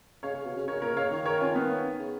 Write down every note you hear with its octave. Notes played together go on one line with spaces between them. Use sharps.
C#3 C#5 F5
C#3
B2
C#3
C#3 A#4 C#5
A#2 A#4 C#5
C#3 C#5 F5
D#3
A#4 C#5
C#4 F4
B3
C#3